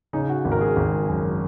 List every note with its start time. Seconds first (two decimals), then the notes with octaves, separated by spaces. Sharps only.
0.13 C#3 D#4
0.29 F#4
0.45 G#1
0.52 A#4
0.61 G#4
0.76 G#1
1.08 F#2